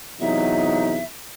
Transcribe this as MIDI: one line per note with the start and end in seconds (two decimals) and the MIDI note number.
0.21 1.00 40
0.21 1.00 48
0.21 1.00 54
0.21 1.00 63
0.21 1.04 76